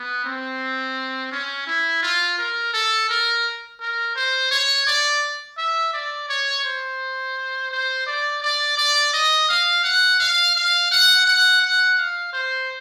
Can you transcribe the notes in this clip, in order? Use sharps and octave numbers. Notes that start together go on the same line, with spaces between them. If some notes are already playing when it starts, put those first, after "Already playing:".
Already playing: B3
C4
C#4
E4
F4
A#4
A4
A#4
A#4
C5
C#5
D5
E5
D5
C#5
C5
C5
D5
D5
D5
D#5
F5
F#5
F5
F5
F#5
F#5
F#5
F5
C5